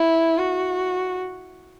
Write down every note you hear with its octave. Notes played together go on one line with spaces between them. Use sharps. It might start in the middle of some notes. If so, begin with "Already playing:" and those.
Already playing: E4
F#4